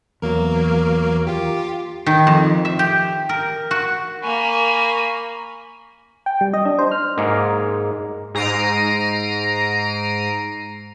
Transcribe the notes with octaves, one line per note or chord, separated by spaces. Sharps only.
E2 F#3 A#3 A#4
F4 G4
D#3
F2
E5
G4
A#4
F#4
A#3 A#4 G#5 B5 C#6
G5
G3
D#5
D4
C5
F6
G#2 G#3 A#3
G#2 A#5 C7 D7 D#7